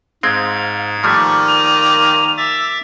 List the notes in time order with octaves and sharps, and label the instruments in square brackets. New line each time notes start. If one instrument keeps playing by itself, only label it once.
[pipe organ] G#2 G#6 [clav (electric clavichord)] G#3 C4 [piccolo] F5
[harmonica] D#3 A#3 D5 [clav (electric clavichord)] F3 G3 A3 [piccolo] C#6
[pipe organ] G#5 [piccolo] F7
[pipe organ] E5 D6 A6 [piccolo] E6